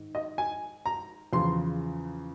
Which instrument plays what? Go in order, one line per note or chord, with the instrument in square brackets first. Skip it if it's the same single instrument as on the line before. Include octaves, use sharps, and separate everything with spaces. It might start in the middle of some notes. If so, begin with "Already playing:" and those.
Already playing: [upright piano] G#2 D#3
D#5
G#5
A#5
E2 C#3 F3 C6